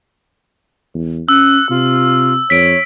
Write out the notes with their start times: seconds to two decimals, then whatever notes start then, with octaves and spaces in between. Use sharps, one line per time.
0.94 E2
1.29 C#4 E6 F#6
1.70 C3 F4
2.50 F2 C#5 B6 D7